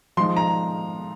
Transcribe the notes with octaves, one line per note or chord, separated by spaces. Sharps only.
F3 G#3 D#4 C6
A#5